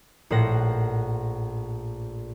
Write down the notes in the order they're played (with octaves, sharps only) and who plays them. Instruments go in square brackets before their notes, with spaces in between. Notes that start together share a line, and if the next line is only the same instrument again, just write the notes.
[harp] A#1 A2 C5 F#5 A#6